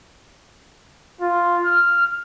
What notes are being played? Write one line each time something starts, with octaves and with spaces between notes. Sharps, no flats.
F4
F6